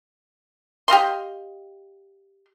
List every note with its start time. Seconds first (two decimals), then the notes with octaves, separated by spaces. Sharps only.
0.88 G4 D#5 F5 C6